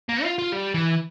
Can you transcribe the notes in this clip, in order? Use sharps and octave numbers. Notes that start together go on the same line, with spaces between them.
A#3
F4
F4
G3
E3